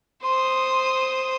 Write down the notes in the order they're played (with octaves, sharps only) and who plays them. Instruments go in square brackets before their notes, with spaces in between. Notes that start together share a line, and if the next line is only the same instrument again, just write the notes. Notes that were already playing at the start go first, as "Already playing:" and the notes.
[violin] C5 D#6 [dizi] C6